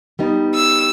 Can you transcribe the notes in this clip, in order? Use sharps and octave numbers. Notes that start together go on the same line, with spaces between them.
G3 B3 D#4
E6